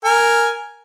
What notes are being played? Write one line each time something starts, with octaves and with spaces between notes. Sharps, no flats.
A#4 G#5